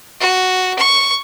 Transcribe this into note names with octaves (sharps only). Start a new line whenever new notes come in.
F#4
C#6